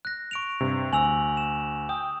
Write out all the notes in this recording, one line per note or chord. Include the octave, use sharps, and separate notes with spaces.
F#6 A#6
C#6 D7 F7
G2 C3
D2 G#5 E6 F7 F#7
E7
G5 D#6